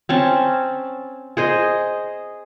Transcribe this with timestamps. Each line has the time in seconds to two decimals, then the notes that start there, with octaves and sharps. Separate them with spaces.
0.09 C4 C#4 A5
1.37 G#4 C5 D#5